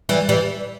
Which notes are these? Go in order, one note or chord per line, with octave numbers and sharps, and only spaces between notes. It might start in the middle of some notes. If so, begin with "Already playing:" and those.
E3 G3
E3 G3